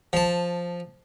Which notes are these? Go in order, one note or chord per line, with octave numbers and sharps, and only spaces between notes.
F3 A5